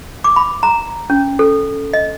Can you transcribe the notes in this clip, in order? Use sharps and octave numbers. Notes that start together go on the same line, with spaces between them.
D6
B5
A#5
C#4
A4
D#5